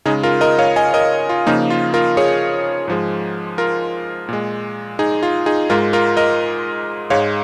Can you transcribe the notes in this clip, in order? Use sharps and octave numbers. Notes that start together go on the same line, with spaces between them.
C#3 G#3 D#4 G#4
F4 A#4
A#4 D#5
C#5 F5
D#5 G#5
A#4 D#5
F4
C#3 F3 A#3 D#4
F4
F4 A#4
G#4 C#5
G#2 F3 G#3
F4 A#4
A#2 G#3
D#4 G#4
F4
D#4 G#4
G#2 G#3 F4 A#4
F4 A#4
A#4 D#5
G#2 G#3 C#5 F5